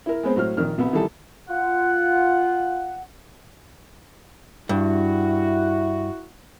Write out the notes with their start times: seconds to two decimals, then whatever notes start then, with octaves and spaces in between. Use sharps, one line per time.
0.06 E4 A#4
0.23 G#3 B3 C4 C5
0.36 A2 F#3 C5 F6
0.57 A#1 D#3 F6
0.78 C2 B2 B3
0.93 D#3 E3 G3 A4
1.50 F4 F#5
4.69 G2 E4 F#4